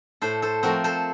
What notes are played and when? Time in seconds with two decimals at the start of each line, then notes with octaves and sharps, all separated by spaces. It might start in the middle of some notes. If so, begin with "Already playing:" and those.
0.22 A2 A4 C5
0.42 A4 C5
0.63 F3 A3 C4 F#4 A#4
0.84 A4 C5